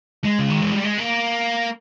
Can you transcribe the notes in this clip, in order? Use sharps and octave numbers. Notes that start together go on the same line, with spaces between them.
G#3
C#3
D#3
E3
G3
G#3
A#3